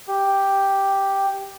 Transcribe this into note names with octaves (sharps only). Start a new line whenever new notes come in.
G4